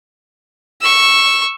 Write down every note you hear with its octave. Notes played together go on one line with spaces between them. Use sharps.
C#6 E6